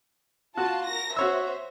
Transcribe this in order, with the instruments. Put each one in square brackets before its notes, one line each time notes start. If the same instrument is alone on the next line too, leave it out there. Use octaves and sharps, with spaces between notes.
[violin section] F4 A5 [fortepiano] F#4
[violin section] A#4 A#6
[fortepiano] F#4 C#5 E6 [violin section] C5 E5